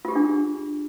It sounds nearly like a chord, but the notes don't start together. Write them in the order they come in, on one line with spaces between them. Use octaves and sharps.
F4 G4 G#4 D4